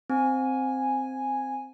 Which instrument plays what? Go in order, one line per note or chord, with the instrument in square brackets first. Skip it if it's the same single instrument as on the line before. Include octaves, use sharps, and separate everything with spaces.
[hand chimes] C4 [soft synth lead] G#5